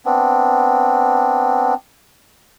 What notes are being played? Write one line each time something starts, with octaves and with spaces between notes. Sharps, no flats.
B3 C4 D4